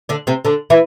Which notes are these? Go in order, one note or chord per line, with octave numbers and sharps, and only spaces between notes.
D3 D4
C3 C4
D3 D4
E3 E4